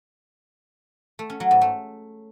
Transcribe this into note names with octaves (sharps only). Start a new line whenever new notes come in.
A3
C#4
F#3
G#2
A3